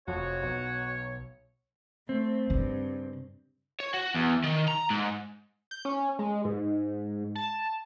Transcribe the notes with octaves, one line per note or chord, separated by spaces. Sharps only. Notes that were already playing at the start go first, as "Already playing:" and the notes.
F1 F2 F#4 C#5
B1
A3 C4
G2 C#3
C#5
F#4
E2
D#3
A#5
G#2
G6
C#4
G#3
G#2
A5